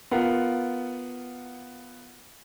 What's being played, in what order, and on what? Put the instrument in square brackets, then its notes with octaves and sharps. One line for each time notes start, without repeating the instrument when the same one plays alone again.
[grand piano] B3 F4 A#4 F5 F#5